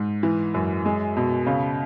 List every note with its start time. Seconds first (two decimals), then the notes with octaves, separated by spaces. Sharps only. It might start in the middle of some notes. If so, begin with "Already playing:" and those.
Already playing: G#2
0.23 E3
0.54 F#2
0.85 G#3
1.16 B2
1.46 C#3